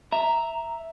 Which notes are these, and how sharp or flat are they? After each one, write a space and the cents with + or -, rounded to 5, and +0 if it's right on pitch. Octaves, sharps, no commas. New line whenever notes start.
E5 +0 A#5 +0